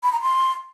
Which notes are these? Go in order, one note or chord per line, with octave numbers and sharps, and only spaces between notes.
B5
A#5
C6